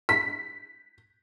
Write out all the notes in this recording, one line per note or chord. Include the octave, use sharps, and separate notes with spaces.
B6